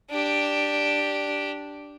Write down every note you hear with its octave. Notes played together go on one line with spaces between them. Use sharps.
D4 G4